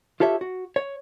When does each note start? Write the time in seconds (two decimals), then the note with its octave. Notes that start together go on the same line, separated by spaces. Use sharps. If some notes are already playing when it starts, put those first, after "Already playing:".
0.20 F4 G4 A4 C#5 E5
0.41 F#4
0.76 C#5